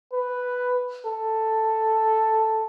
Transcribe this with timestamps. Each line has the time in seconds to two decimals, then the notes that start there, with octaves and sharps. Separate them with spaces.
0.13 B4
1.06 A4